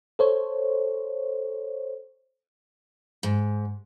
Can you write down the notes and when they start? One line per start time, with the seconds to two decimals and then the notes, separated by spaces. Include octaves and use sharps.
0.19 A4 C5 C#5
3.23 G#2